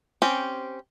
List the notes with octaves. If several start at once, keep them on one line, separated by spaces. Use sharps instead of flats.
C4 C#4 G4 C5